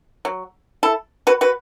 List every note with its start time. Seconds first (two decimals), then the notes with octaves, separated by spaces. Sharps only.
0.25 F#3
0.83 E4 A4
1.27 F#4 B4
1.41 F#4 B4